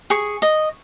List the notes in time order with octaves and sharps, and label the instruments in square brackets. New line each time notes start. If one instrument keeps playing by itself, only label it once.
[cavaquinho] G#4 C#6
D#5